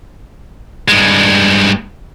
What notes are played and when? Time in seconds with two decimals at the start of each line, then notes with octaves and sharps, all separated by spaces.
0.88 G2 G#3